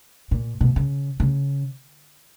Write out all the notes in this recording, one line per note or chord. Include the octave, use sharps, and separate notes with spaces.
A#2
B2
C#3
C#3